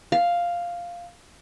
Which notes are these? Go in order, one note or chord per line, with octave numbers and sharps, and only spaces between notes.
F5